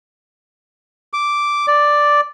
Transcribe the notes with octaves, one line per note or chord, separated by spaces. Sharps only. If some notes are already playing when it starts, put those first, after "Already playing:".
D6
D5